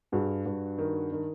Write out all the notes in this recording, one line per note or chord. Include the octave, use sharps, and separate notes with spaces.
G2 F#4 G#4
G2
D#3
D#3